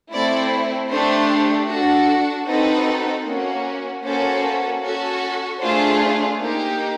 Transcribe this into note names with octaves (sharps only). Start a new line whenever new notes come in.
A3 C4 E4 D5
A3 D4 G4 C5
D4 F#4 A4
C4 D#4 F#4 A4 B4
A#3 C#4 F#4
A#3 C#4 F#4 A4 C5
C#4 F#4 A4
A3 D4 F4 G#4 C5
A#3 D#4 G4